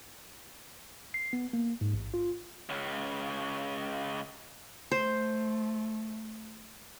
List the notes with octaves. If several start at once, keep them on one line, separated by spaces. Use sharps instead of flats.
C7
B3
A#3
G#2
A1
F4
C#2 C#3
A3 C5